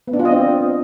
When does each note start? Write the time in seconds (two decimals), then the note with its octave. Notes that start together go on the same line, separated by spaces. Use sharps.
0.08 B3
0.13 D4
0.19 F4
0.25 D#5
0.31 C4